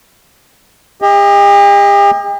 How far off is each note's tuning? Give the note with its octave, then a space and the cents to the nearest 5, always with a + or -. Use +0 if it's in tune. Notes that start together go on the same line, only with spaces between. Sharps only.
G4 +45 D#5 +25